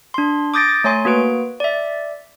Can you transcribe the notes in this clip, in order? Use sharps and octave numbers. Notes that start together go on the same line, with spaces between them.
D4 C6
D6 D#6 G6 A6 A#6 D7
A3 C#5 G#5 C6
A#3 F#4 B4 D7
D5 E5